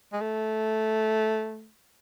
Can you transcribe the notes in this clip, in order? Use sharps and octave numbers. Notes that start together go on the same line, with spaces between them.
G#3
A3